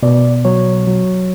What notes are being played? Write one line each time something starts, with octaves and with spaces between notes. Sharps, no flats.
B2 D5
F#3 C#5
F#3